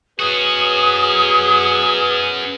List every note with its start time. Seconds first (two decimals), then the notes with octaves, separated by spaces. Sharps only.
0.20 B2 F#3 C#4 F#4 G#4 B4 D#6